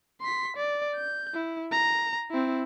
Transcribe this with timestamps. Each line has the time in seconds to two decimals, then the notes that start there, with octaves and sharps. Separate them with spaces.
0.21 C6 B6
0.57 D5
0.95 G6
1.34 E4
1.72 A#5
2.31 C4 E4